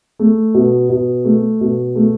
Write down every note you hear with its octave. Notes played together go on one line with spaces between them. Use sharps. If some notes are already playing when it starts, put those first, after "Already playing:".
A3
B2
B2
A3
B2
A3